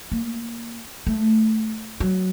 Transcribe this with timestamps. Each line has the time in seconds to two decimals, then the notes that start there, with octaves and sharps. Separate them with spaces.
0.12 A#3
1.07 A3
2.00 F#3